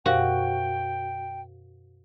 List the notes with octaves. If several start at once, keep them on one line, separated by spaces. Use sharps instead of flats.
F#2 B2 F#4 G4 A#4 C5 F5 G5